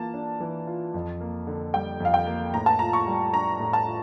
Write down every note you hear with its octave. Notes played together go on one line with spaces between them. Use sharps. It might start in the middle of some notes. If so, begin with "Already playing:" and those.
Already playing: E3 A#3 F4 A5
D4
E3
F4
F2
A#3
D3
G3 G5
F2 F5
G5
A#3
A2 A#5
A5
F4 A#5
C#6
G3
D4 A#5
A2
A5
F4